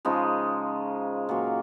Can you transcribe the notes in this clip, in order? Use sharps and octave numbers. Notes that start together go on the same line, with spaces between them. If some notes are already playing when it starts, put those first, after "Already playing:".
C#3 F3 G#3 D#4
A#2 F#3 A#3